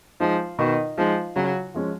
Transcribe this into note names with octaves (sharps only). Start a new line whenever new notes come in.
F3 G#3 D#4
B2 D#3
F3 G#3 D#4
C#3 F#3
F3 G#3 C#4